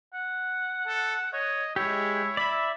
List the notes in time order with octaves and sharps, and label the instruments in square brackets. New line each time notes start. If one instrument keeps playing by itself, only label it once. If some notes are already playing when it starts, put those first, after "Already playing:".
[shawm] F#5
[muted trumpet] A4
[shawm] C#5 [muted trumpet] D#5
[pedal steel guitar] G#3 G4 [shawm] E4 [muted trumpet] C#5
[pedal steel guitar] D5 E5 [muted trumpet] B5